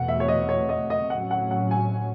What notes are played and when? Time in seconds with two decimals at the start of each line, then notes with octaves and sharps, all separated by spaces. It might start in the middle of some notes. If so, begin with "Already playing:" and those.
Already playing: E2 B2 A3 F#5
0.08 E5
0.20 C#5
0.28 D#5
0.49 C#5
0.69 D#5
0.90 D#5
1.10 A2 F#3 C#4 F#5
1.31 F#5
1.51 F#5
1.71 G#5